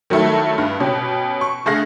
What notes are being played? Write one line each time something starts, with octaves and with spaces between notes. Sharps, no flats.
D#3 F#3 G3 A3 E4 A4
G2
B2 C#4 G4
C#6
D3 A3 G#4 F5 F#6 A#6